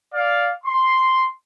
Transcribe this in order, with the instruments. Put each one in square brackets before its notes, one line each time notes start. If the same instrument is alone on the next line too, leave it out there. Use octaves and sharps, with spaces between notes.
[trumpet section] D5 F5
C6